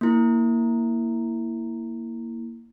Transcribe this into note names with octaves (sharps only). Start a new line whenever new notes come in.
A#3 E4